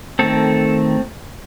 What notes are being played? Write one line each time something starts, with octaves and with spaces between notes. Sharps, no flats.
D#3 A3 C4 A4